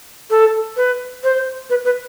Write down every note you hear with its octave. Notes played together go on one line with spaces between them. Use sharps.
A4
B4
C5
B4
B4